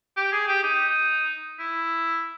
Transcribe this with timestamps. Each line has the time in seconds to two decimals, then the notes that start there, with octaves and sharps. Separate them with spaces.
0.17 G4
0.32 G#4
0.48 G4
0.63 D#4
1.59 E4